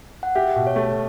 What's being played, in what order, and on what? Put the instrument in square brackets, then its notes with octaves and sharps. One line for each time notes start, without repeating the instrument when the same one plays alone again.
[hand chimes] F#5
[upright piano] G4 [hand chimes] E5
[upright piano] B2
[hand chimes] C#5
[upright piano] A3